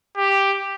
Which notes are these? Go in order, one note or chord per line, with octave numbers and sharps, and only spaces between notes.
G4